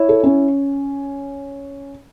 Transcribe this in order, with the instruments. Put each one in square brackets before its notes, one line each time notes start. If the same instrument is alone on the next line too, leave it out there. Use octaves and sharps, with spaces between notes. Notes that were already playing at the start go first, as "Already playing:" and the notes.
Already playing: [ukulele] E4 C#5
[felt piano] A4
C#4